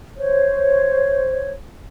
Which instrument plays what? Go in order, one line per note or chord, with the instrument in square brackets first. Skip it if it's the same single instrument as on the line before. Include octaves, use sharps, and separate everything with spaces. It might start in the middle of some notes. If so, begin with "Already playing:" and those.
[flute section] C5 C#5